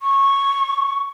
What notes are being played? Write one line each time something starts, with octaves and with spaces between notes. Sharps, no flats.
C#6